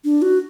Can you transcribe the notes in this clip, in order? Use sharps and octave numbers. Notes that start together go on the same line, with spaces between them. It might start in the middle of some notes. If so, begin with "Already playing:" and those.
D4
F#4